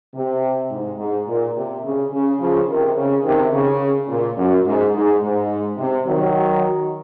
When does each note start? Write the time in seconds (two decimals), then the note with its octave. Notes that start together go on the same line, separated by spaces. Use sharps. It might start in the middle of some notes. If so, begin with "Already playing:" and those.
0.15 C3
0.71 G#2
0.99 G#2
1.27 A#2
1.55 C3
1.84 C#3
2.12 C#3
2.39 C#3 F3
2.68 C3 D#3
2.96 C#3
3.24 C3 D#3
3.52 C#3
4.09 A#2
4.37 F#2
4.66 G#2
4.94 G#2
5.22 G#2
5.78 C3
6.06 D#3 F#3